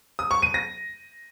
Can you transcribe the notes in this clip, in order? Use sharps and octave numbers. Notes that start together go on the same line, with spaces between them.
D#6
C#6
D#7
A#6